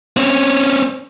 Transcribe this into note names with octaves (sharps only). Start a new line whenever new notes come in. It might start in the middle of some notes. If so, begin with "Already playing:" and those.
C4 C#4